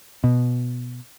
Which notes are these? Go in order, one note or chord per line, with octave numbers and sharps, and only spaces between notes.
B2